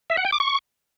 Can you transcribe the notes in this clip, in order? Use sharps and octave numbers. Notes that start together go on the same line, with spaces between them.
E5
F#5
G5
D6
C#6